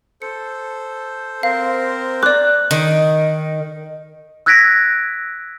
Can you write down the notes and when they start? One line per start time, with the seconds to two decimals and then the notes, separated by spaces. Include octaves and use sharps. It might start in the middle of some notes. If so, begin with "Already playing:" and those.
0.22 A4 C5 C#7
1.43 C4 A#4 C5 F5
2.23 D5 D6 F#6
2.71 D#3
4.46 E6 F#6 G#6 A#6 B6 D7